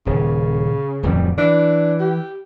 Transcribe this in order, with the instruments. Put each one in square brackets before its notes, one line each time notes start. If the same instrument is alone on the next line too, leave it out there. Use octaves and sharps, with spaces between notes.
[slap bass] D#1 [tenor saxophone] C#3
[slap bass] D1 F2 G3
[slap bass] E3 [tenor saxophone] D4
[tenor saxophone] G4